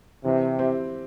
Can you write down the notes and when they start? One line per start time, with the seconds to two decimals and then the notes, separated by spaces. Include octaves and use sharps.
0.25 C3 E3
0.59 C4 E4 G4